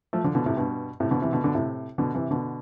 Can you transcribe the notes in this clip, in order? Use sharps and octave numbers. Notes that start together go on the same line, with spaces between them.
F3 A3
D3 F3
B2 D3
A2 C3
G2 B2
A2 C3
B2 D3
C3 E3
B2 D3
B2 D3
A2 C3
B2 D3
C3 E3
B2 D3